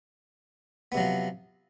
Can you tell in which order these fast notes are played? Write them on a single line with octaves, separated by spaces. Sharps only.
B3 C3 F#3 F3